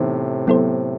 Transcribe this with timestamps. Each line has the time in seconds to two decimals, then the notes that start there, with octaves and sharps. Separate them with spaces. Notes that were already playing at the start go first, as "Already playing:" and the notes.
Already playing: A2 C3 E3 B3 D#4 C5
0.47 F#3 B3 E4 A4 C5